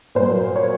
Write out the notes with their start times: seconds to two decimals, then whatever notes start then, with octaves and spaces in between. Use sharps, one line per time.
0.15 A#2 F#3 C5
0.56 C#5